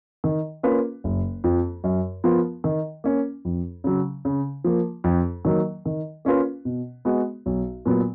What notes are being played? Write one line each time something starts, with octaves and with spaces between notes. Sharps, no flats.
D#3
A#3 C#4 F4 B4
F#1
F2 F3
F#2
F3 B3 F4 A#4
D#3
A#3 C#4
F2
C#3 F#3
C#3
F3 A#3
F2
D#3 F#3 A#3
D#3
A#3 C#4 F4 B4
B2
G#3 B3 F#4
B1
A#2 F#3 B3